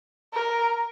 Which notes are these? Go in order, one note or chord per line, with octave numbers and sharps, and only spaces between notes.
A#4